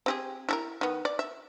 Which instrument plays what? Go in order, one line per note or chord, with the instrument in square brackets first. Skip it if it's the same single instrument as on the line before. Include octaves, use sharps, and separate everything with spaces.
[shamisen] C4 G4 G#4
E4 A4 A#4
D#3 B3
D5
E5